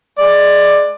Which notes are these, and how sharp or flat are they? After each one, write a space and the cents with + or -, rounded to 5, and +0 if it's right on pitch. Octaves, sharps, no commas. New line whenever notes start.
G#3 +10 D5 +15